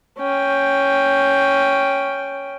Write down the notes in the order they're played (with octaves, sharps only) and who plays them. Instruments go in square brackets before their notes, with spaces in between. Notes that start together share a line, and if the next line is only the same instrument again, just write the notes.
[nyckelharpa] C#4 G5